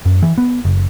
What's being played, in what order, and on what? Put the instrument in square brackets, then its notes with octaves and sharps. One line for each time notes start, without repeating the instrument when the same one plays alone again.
[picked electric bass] F#2
E3
B3
F#1